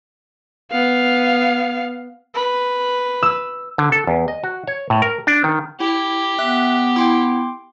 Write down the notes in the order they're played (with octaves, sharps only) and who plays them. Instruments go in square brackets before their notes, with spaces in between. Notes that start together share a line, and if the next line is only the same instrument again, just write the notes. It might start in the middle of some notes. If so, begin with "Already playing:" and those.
[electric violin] B3 F5
[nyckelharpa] B4
[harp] E6
[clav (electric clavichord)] D3
A4
E2
D#5
F#4
C#5
A2
A#4
D4
D#3
[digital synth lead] E4 [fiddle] G4
[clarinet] B3 [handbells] E5 [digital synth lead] F#6
[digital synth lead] E4 [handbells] G5 C6 D6